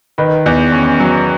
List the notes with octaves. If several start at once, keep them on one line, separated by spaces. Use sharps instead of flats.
D#3 B4
E2
C#4
F#3